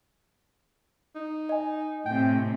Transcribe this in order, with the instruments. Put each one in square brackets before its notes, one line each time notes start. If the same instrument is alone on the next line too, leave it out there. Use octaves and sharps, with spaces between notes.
[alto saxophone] D#4
[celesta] D#5 G#5
[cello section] A2 C3 [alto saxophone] G5